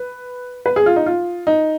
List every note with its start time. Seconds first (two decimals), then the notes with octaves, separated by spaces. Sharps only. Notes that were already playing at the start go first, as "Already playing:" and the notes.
Already playing: B4
0.66 B4
0.76 G#4
0.86 F4
0.96 D#4
1.06 F4
1.47 D#4